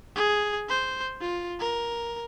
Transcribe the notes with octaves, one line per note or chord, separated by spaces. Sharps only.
G#4
C5
F4
A#4